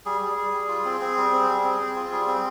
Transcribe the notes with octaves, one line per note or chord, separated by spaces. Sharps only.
G3 G#4
G3
G3
G3
F4
C4
C4
G3
C4
G3
C4
C4
F4
G3
C4